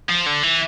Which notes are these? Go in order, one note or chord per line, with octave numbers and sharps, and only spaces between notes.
F3
D3
E3